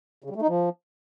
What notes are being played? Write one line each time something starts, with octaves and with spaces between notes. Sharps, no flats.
C#3
G3
A3
D#4
F3